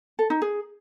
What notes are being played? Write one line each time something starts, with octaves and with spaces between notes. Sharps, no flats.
A4
D#4
G#4